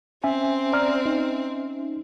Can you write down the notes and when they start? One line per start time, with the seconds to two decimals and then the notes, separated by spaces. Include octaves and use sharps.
0.24 C4 C#4 E5 G#5
0.73 D5 A#5 F6
1.06 D#4